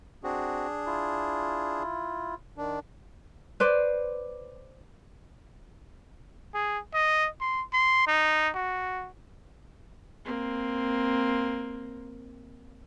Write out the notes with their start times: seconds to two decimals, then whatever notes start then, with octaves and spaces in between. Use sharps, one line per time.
0.24 C4 D4 F#4 G#4
0.86 E4 F4
2.58 D#3 D4
3.60 B4 C5 D5
6.54 G#4
6.94 D#5
7.40 C6
7.73 C6
8.07 D#4
8.55 F#4
10.25 A#3 C4